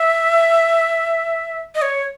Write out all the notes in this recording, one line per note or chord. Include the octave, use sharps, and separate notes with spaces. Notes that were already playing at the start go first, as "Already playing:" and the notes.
Already playing: E5
D#5
C#5